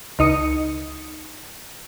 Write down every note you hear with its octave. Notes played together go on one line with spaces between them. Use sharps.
C#2 D#4 D#6 C#7